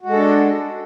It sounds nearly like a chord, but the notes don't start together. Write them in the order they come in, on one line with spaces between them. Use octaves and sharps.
F#4 G#3 A4 D4